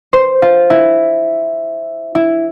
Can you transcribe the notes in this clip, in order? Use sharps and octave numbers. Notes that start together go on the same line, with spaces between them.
C5
F4
E4
E4